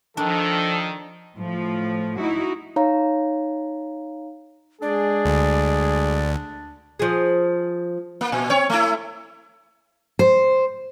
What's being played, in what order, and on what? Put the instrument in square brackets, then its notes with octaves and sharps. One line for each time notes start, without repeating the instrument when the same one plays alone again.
[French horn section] D#3 [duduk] F3 [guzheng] D4 [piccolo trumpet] A4
[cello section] A2 F3
D#4 E4 F#4
[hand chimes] D#4 C#5 F5 A#5
[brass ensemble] G#3 G#4 [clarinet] D4 [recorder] D5
[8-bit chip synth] D2
[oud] F3 G#4
[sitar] A#3
A#2
C4 C#5
A3 E4
[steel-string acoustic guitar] C5